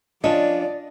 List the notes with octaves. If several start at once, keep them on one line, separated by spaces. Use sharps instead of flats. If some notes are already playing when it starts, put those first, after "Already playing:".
F3 C#4 D4 D5 D#5